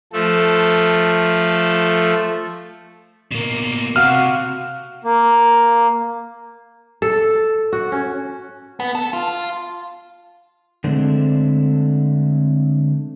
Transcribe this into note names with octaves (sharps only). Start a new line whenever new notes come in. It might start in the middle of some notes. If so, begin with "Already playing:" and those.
F3 A3 A4
B2 A#3
C3 F#4 F5 F6
A#3
A4
F#4
C#4
B3
A4
F4
D3 G#3 A3 C4 D4